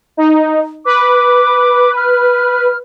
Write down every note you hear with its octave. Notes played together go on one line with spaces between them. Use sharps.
D#4
B4 D6
F6